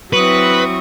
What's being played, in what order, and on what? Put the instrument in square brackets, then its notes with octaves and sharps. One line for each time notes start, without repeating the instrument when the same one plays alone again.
[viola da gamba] F#3 C4 E4 [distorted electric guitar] B4 [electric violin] C#6 D#6